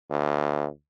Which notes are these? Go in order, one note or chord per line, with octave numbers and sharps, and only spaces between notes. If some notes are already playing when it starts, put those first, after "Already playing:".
D2